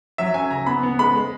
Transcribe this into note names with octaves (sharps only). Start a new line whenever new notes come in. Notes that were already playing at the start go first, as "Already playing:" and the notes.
F#3 E5
C#4 G#5
C#3 A#5
B3 B5
B3
G#3 B5
G#3